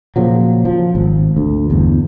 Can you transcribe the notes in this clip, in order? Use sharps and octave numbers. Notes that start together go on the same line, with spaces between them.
A#2 C#3 F3 F#3
F3
G#1
D2
G1 E2